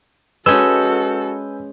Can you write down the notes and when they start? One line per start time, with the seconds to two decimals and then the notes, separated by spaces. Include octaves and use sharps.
0.46 G#3 C#4 F#4 A4 B4 G#5 E6 G6